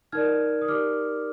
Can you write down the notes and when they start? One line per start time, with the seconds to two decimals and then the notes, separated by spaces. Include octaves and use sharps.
0.12 D#4 A#4 D5 F6 G#6
0.62 D#6
0.68 D#4 G4 A#4 D5 D6 F6